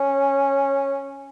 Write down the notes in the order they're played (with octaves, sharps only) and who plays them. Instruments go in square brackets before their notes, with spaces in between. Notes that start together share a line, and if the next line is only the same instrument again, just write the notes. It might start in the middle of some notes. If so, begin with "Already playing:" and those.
Already playing: [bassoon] C#4